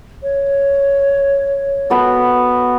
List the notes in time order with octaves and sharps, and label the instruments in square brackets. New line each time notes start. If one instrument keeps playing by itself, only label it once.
[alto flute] C#5
[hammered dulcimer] B3 F#4 A4